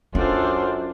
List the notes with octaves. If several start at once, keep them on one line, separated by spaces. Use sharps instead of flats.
F#2 C#4 D4 F4 A4 C5